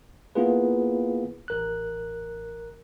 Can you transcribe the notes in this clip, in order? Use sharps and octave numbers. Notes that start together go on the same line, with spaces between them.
A#3 B3 E4 F4 G#4 B4
A1 A#4 F#6